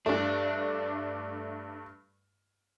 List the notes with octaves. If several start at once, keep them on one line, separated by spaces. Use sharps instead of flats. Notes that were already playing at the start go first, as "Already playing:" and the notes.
G2 A3 D4